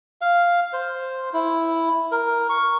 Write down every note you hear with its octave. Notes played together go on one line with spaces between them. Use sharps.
F5
C5
E4
A#4
C#6